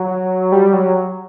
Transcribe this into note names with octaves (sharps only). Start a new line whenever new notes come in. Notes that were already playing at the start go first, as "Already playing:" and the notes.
Already playing: F#3
G3
F#3